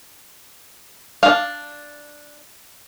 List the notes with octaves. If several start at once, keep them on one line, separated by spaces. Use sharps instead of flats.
D4 F5